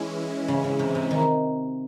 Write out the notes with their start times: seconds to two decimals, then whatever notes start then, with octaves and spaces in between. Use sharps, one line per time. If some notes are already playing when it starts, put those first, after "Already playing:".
Already playing: E3 G#3 C#4 E4
0.48 C#3
0.64 C#3
0.79 C3
0.95 C3
1.11 D#3